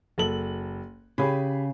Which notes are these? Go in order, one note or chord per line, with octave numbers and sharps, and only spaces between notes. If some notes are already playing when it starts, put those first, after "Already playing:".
F#1 A4 F#7
C#3 G4 G#4 B5